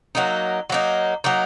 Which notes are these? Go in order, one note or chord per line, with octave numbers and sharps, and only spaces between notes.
F#3 A#3 D#4
F#3 A#3 D#4
F#3 A#3 D#4